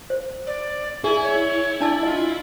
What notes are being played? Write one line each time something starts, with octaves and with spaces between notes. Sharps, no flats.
C5
D5
E4 G#4 G#5
C#5
D4 D5 A5 E6
F4 D#5